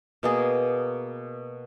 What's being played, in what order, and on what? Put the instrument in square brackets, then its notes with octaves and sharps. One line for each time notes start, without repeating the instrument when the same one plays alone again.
[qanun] B2 A#3 G#4